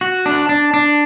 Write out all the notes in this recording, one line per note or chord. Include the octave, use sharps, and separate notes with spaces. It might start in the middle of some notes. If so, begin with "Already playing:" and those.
F#4
D4
D4
D4